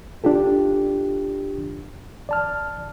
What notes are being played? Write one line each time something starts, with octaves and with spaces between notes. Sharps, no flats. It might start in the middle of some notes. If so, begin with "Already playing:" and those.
D4 F4 G4 A4
D5 A5 F6